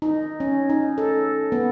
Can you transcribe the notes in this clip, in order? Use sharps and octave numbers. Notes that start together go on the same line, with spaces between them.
D#4
C#4
D#4
A4
B3